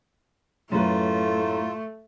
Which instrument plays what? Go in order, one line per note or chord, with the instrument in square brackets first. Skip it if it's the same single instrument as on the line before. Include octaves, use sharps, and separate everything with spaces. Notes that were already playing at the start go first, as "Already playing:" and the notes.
[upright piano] F#2 B4 [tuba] A2 [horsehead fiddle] A3 [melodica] F4